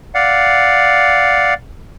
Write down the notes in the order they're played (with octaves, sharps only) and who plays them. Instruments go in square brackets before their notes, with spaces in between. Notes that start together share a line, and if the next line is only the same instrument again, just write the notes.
[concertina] D5 F5 F#5